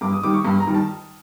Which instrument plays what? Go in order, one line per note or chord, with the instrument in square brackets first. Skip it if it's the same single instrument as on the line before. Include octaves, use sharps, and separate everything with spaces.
[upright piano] G2 D6
D#6
D#3 G3 D6
C#6
G2
A#5
D#3 G3
A5